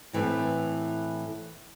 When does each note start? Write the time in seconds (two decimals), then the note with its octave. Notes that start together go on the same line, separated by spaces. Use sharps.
0.13 A2 E3 A3 C4